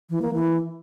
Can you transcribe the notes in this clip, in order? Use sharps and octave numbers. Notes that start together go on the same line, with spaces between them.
E3
A#3
E3